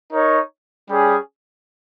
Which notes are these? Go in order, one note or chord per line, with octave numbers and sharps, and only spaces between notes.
D#4 A#4 C#5
G3 C#4 G#4